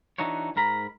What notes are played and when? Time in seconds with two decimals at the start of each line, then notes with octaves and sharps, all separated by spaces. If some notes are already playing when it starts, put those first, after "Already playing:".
0.18 E3 D4 D#4 F#4 C#5
0.56 G#2 A#4 A#5 B5